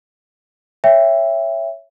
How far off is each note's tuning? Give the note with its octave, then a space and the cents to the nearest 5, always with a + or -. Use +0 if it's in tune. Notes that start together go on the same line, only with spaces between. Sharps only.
C#5 +0 E5 +10 G5 +25